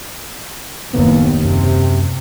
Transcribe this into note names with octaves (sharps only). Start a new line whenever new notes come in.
F#1 D#2 A2 B3
F#2 C3